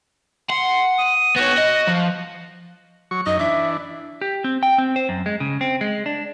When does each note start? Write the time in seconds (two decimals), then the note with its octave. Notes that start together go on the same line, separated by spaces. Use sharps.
0.50 F#5 C6
0.98 D#6
1.36 B3 F#4 C#5
1.58 D#5
1.88 F3
3.11 F#3 C#6
3.26 F#2 D#4 D#5
3.39 E3 D4 E5
4.21 G4
4.44 C4
4.63 G5
4.78 C4
4.96 C5
5.09 F#2
5.26 G#3
5.40 C#3
5.61 C4
5.81 G#3
6.06 D4